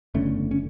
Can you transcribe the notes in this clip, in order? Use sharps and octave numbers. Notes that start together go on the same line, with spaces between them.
F#1 E2 D3 A3 C#4
C#4